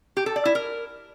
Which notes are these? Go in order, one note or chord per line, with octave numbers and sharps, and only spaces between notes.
G4
A4
D5
E4
A#4